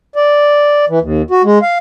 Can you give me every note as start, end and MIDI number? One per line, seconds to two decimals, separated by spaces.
0.16 0.85 74
0.89 0.99 52
1.01 1.22 39
1.31 1.42 66
1.44 1.59 56
1.62 1.78 77